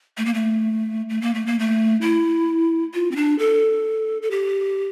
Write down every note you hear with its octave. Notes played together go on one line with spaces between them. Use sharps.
A3
A#3
A3
A3
A#3
A3
A#3
A3
E4
F4
C4
D4
A4
A4
G4